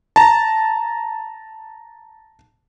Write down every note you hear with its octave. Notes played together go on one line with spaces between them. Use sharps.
A5 A#5